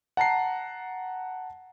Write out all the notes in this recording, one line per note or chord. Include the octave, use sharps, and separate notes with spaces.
F#5 A5 A#5 C7